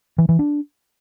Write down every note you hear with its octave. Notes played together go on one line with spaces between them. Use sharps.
E3
E3
D4